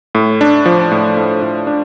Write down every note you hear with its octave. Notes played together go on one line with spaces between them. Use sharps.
A2
D4
F3
A2
A2
A2
D4